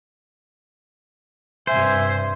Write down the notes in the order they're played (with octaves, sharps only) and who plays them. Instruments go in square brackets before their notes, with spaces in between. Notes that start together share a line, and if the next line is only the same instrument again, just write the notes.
[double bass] G2 C3 [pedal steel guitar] C5 [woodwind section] E5 G#5